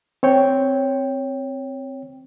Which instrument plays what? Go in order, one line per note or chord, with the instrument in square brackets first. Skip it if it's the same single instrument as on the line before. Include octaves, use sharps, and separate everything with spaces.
[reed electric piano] C4 C#5 G5